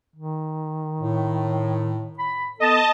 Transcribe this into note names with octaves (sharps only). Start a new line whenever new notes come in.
D#3
A2
B5
B3 A4 D#5 A5